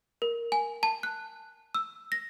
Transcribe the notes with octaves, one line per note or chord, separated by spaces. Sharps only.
A#4
G#5
A5
F#6
E6
A#6